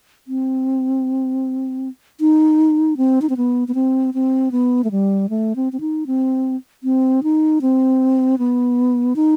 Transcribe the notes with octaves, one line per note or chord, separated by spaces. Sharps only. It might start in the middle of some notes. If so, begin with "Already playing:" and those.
C4
D#4
C4
D#4
C4
B3
B3
C4
C4
B3
A3
G3
A3
C4
C4
D#4
C4
C4
D#4
C4
B3
D#4